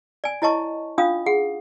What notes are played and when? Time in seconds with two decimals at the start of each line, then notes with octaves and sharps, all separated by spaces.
0.24 D5 G#5
0.42 E4 C#5 D#5 A5 C#6
0.98 C#4 D4 F4 F5 D#6
1.26 G#4 F#5